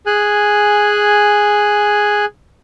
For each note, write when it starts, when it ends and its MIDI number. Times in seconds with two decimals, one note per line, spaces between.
0.06 2.25 68
0.06 2.25 80
0.06 2.25 90